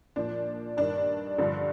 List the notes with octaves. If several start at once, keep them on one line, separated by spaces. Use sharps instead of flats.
A#2 F3 D4
G2 D#3 D4
G2 D3 F3